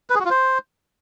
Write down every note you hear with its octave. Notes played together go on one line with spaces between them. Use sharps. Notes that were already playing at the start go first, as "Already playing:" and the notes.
B4
G#4
F#4
F4
C5